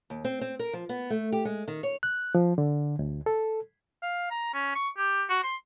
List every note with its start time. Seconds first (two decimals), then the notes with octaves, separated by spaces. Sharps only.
0.10 D#2
0.24 C4
0.41 C4
0.59 A#4
0.73 F3
0.89 B3
1.10 A3
1.32 G4
1.45 G#3
1.68 D#3
1.83 C#5
2.03 F#6
2.35 F3
2.58 D3
2.99 D2
3.26 A4
4.02 F5
4.31 A#5
4.54 C#4
4.75 C#6
4.98 G4
5.30 F#4
5.43 C6